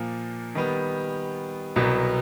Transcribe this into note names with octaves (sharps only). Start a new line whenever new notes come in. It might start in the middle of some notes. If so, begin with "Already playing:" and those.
Already playing: A#2 F3 A#3
D#3 G3 B3
C2 B2 F#3 B3